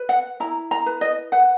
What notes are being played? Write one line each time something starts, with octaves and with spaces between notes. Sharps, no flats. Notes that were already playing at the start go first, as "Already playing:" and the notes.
Already playing: B4
F#5
E4 A#5
A#5
B4
D#5
B4 F#5